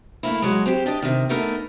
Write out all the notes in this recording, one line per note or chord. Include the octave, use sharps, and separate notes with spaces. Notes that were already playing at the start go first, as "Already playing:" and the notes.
A3 A#3 E4
F#3 G#3
C4 G4
D4 G4 D#5
C3 D#3
A3 B3 D#4 A4 A#4